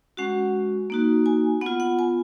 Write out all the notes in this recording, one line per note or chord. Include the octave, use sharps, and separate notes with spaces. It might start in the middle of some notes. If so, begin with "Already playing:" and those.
G#3 C#4 F#4 F#5
A#3 D#4 F#4
G#5
B3 F4 F#5
F#5
G#5